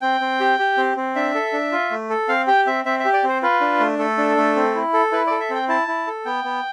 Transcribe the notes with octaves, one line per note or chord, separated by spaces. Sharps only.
C4 G5
C4
G4
G4
C4
C4
D4 E5
A4
D4
F4
A3
A4
C4 F5
G4 G5
C4 E5
C4 E5
E5
G4
D5
C4 C5
F4 B4
D4
A3
A3 A4
D4
A3
C4
E4
A4
E4 B4
A4 D5
E5
C4 G5
E4 A5
E4
A4
B3 G5
B3